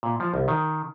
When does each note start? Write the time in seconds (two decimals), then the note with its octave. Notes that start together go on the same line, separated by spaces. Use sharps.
0.03 A#2
0.20 F3
0.34 C2
0.48 D#3